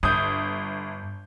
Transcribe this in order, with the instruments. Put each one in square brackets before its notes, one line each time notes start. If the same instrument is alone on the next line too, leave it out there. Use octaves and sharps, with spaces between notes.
[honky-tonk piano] G1 [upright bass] G2 [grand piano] D#6 G6